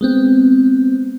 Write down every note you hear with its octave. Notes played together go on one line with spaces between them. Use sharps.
G#3 B3 C4